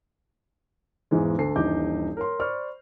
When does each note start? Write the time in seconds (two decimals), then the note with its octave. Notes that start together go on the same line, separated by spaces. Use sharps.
1.11 B1 E2 G#2 E3 G#3
1.38 D2 A4 C7
1.56 D#1 G2 E3 D#4 D6 G6
2.17 A#4 C#5 C6
2.39 C5 D5 B5 C#6 F6